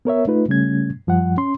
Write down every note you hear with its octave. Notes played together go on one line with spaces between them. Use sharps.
B3 A#4 C#5 E5
A3 D#4 F4 B4
C#3 G3 A3 C#4 G#6
F#2 F3 G3 F#5
C#4 C6